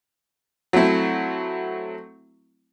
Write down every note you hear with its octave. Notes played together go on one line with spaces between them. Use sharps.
F#3 A3 C4 E4